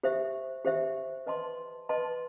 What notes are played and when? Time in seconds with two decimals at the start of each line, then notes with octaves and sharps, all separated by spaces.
0.03 G4 C5 E5
0.65 G4 C5 E5
1.27 B4 D#5 A5 C6
1.89 B4 D#5 A5 C6